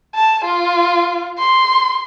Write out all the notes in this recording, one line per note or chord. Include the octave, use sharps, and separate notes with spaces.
A5
F4
C6